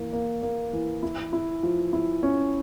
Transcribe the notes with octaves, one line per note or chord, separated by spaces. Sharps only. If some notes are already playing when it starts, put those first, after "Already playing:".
Already playing: E3 A#3
A#3
A#3
E3
E4
E4
F3
E4
C#4